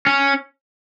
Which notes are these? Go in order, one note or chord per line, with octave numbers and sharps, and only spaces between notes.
C#4